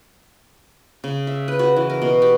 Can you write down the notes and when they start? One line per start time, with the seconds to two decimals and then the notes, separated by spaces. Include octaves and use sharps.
1.04 C#3
1.27 E5
1.48 B4
1.59 F#4
1.76 E3
1.90 A#4
2.02 B2
2.22 G4